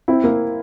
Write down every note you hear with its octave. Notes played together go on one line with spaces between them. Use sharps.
C4 E4
A#3